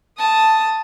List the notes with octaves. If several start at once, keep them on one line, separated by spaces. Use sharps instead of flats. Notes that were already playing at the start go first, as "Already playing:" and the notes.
A5 D#6